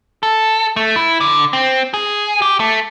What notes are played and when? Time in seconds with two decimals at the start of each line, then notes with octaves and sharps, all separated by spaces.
0.23 A4
0.76 A3
0.96 E4
1.21 D3
1.53 C4
1.94 G#4
2.42 G4
2.60 A3